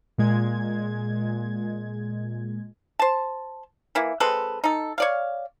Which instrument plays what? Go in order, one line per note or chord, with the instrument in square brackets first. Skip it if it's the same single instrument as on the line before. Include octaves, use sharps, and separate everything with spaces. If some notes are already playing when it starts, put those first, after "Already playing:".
[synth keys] A#2 G#3 G#6
[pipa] C5 A5
E3 A#3 E4
G#3 C4 A4 B4
D#4 A4
C#5 D5 F5